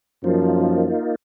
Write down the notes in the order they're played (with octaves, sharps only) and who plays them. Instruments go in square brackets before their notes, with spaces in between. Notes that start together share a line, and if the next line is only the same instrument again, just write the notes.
[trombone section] F#2 F3 [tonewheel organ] A#3 D#4 F4